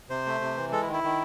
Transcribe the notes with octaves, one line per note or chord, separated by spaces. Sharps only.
C3 C5
A3
C3
E3
G#3 A4
E4
D#3
E4
D#3